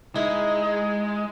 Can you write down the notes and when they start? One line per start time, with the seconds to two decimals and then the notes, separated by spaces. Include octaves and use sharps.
0.15 G#3 D#4 E4